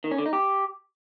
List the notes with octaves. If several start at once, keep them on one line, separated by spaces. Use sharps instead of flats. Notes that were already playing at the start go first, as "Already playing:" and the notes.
D#3
C#4
D3
D#4
G4